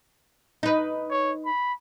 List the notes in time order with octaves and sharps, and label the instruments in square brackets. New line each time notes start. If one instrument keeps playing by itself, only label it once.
[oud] D#4 B4
[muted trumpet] C#5
B5